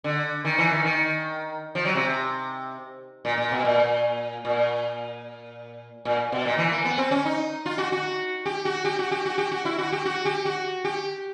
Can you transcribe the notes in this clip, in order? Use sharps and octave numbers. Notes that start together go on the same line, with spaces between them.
D3
D#3
E3
D#3
D#3
F3
F#3
C3
A#2
A#2
B2
A#2
A#2
A#2
B2
A#2
E3
A#3
B3
C4
C#4
D#4
F4
F#4
F#4
G4
F#4
G4
F#4
G4
F#4
G4
F#4
E4
F#4
G4
F#4
G4
F#4
G4